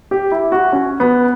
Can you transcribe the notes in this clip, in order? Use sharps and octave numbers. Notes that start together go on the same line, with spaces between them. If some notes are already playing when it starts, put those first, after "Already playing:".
G4
E4
F#4
C#4
B3